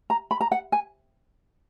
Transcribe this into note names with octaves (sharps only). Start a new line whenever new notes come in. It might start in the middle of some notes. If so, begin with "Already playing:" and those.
A#5
B5
A#5
F#5
G#5